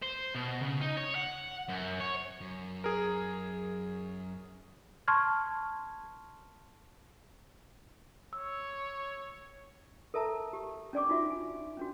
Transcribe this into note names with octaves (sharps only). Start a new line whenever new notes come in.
C5
B2
C#3
D#4
C#5
F#5
F#2
C#5
F#2
G#4 A#4
A5 C6 C#6 F6 G#6
C#5 E6
A4 A#4 E5 A5 A#5
G4
C#4 D4 D5 G#5 C#6 D6
D#4 F4 F#4 E5
G#5
C#4 D4 F#4